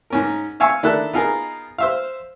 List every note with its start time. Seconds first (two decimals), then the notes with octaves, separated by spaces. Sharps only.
0.10 G#2 C#4 A#4
0.60 E5 F5 G#5 C#6 E6
0.83 D#3 D4 E4 A4 F#6
1.13 B3 D#4 F4 G#4 A#4
1.78 C5 E5 F5